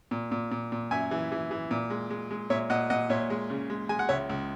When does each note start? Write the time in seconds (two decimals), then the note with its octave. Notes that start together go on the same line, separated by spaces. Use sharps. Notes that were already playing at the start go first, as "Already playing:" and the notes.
0.11 A#2
0.31 A#2
0.51 A#2
0.72 A#2
0.91 F#2 E5 G#5
1.11 E3
1.32 E3
1.51 E3
1.71 A#2
1.90 G#3
2.10 G#3
2.31 G#3
2.50 A#2 C#5 E5
2.70 A#2 D#5 F#5
2.90 A#2 D#5 F#5
3.09 A#2 C#5 E5
3.30 G#3
3.50 C#3
3.70 G#3
3.89 G#3 G#5
3.99 F#5
4.09 C#2 C#5 E5
4.29 C#2